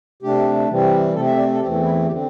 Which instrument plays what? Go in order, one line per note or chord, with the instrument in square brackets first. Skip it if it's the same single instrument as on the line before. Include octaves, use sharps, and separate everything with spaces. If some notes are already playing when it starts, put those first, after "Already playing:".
[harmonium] C3 A3 D4 G4
C3 E3 G3 C4
C3 A3 C4 A4
E5
D5
A4
E2 E3 A3 C4 G4
E4
D3 C4 G4